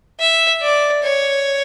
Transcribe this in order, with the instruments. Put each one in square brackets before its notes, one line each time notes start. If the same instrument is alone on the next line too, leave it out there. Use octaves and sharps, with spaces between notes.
[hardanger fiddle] E5
D5
C#5